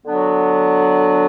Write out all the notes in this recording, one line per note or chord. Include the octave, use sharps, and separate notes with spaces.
D3 F#3 B3 D4 F#4